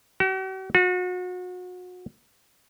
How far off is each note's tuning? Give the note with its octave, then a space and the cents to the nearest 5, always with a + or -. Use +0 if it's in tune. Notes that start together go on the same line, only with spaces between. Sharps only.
F#4 +45
F#4 -35